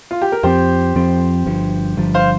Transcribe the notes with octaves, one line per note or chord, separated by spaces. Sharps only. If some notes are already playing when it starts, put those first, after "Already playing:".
F4
G4
A#4
F2 F3 C4 G4 C5
F2 F3 C4
G1 G2 F3
G1 G2 F3
C5 F5